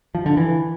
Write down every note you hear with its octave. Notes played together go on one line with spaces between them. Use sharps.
F3
D3
E3